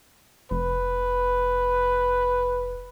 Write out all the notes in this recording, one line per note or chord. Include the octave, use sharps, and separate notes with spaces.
F1 B4